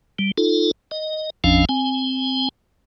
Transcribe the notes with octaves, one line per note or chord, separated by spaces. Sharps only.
G3
D#4 F4 A4
D#5
G#1 E2 F3 C#4 D4 F5
C4 G#5